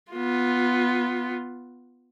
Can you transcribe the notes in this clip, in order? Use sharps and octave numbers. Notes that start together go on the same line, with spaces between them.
B3 F4